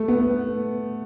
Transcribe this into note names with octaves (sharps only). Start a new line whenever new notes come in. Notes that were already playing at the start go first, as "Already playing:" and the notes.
Already playing: A3
B3